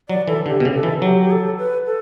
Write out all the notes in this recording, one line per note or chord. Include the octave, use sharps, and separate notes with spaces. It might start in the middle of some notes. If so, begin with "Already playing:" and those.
F#3 D5
E3 A4
D3 G4
B2
C#3
A4
E3
F#3 G4
G4
A4
B4
A4